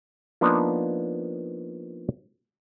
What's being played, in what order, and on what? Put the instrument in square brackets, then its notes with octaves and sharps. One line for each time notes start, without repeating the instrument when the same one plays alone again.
[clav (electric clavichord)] F3 A#3 B3 D4 D#4